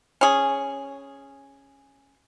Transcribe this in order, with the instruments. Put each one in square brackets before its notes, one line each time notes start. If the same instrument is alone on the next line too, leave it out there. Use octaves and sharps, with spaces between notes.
[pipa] C#4 G#4